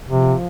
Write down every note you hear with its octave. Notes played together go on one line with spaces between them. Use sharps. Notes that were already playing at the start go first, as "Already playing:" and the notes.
C3 F3